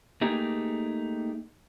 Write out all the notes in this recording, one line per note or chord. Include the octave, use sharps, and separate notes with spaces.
A3 A#3 D#4 G4 G#4